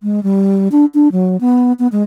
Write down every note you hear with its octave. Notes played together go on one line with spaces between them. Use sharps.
G#3
G3
D4
D4
F#3
B3
B3
G#3